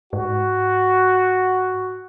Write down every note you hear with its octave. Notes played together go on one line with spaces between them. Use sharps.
G#2 F#4